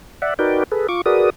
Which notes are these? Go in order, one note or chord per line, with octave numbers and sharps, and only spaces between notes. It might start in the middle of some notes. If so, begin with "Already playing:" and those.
D5 E5 F#5
D#4 F#4 A#4 B4 D5 G5
G#4 A4 B4
F4 C#6 D6
F#4 G#4 A#4 B4 D5 D#6